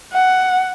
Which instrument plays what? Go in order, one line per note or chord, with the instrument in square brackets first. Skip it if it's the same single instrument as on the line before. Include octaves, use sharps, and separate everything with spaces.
[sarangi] F#5